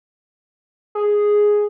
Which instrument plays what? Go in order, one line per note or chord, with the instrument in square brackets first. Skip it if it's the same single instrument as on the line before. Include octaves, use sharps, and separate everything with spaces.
[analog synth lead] G#4